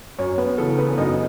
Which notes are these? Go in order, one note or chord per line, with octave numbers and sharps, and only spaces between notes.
F#2 C#4 C#5
B3 B4
C#3 E3 A4
B3 B4
F#2 D#4 D#5